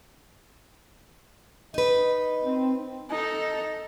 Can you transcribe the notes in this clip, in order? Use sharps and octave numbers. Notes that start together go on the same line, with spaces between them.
D#4 B4 D#5
C4
D#4 A4